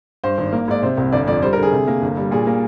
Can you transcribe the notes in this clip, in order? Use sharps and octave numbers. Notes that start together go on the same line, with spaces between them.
G2 C5
G#1
A#3
G#2 D5
C3 C5
C2
G1 D5
F2 D5
G3 C5
A#4
D3
G#4
C3
A#3
G1
G3
A#2 G#4
A#3